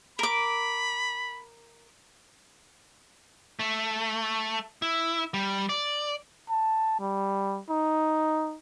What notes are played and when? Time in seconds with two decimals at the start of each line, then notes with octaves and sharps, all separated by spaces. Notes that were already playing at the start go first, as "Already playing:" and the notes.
0.19 A#4 B5 D6
3.60 A3
4.82 E4
5.34 G3
5.69 D5
6.50 A5
7.00 G3
7.70 D#4